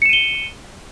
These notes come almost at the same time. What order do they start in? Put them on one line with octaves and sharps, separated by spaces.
C#7 E7 D#7 G7